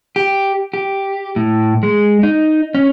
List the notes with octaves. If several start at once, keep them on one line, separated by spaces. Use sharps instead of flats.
G4
G4
A2
G#3
D#4
C#4